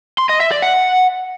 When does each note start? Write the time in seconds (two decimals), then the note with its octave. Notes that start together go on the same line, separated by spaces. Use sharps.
0.18 C6
0.29 D#5
0.40 E5
0.51 D5
0.62 F#5